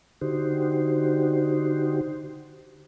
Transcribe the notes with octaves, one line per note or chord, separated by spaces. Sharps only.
D3 D#4 F#4 G4 C5